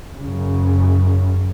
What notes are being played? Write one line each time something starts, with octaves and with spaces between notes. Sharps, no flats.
F#2 C#3